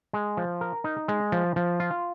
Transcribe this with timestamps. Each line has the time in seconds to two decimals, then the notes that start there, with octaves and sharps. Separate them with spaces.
0.13 G#3
0.37 F3
0.61 A#4
0.84 D#4
1.08 G#3
1.32 F3
1.56 F3
1.80 F4